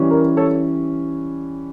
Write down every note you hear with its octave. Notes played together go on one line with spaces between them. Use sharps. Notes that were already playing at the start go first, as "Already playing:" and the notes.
Already playing: E3 G3 C#4
A#4
A4 C#5